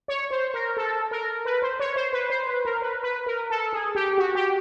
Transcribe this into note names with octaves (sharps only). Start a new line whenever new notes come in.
C#5
C5
A#4
A4
A#4
B4
C5
C#5
C5
B4
C5
B4
A#4
B4
B4
A#4
A4
G#4
G4
F#4
G4